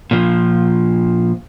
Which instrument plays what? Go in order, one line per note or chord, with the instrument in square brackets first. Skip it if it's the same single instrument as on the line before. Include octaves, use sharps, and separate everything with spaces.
[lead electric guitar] A#2 F3